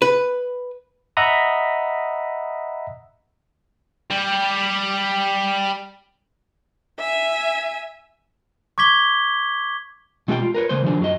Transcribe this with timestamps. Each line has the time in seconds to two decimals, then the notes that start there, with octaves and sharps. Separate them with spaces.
0.02 B4
1.17 D#5 E5 F#5 A#5 B5 D#6
4.10 G3 G4
6.99 E5 G#5
8.78 C#6 D6 G#6 B6 G7
10.28 B2 G#3 F4 G4 F5 G5
10.42 F4
10.54 A#4 B4 C#5
10.69 C#3 G#3 A#3 B4 C5
10.84 D#3 F3 F#3 D4 G#4
11.00 F#2 F#3 B3 F#4 D#5